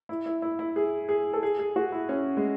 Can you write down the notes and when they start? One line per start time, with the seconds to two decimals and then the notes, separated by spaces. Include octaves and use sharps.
0.09 E4
0.26 E4
0.42 E4
0.59 E4
0.76 G#4
1.09 G#4
1.33 A4
1.43 G#4
1.59 G#4
1.76 F#4
1.92 E4
2.09 C#4
2.37 G#3